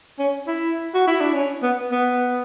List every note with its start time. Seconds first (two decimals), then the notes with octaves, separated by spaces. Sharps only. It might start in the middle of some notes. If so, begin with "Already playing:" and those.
0.19 C#4
0.47 E4
0.94 F#4
1.07 E4
1.21 D4
1.34 C#4
1.62 B3
1.91 B3